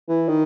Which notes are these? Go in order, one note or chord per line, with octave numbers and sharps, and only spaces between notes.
E3
D#3